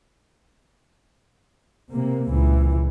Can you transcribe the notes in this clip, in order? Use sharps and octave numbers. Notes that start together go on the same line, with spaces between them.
C3 A#3
C#2 A#2 E3